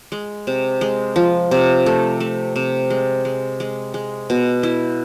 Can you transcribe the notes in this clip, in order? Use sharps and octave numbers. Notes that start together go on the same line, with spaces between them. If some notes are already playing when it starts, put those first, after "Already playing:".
G#3
C3
G#3
F3
C3
A3
A3
C3
G#3
G#3
G#3
G#3
B2
E4